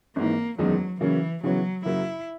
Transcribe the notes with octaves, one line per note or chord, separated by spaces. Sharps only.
G#1 G#2 E3 A#3
F#1 E2 D#3 F#3 G#3 D#4
C#3 E3 F#3 A#3 C#4
C#3 E3 F#3 B3 F#4 C#5
F#2 C#3 F#3 A#3 E4